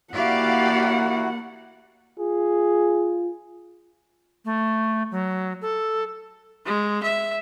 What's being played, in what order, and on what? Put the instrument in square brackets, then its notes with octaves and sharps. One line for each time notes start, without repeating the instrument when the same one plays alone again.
[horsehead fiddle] A#3 F#5 [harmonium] E4 F#4 [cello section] G4 D5 F5
[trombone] F4 [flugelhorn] G#4
[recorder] A3
F#3
A4
[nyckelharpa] G#3
E5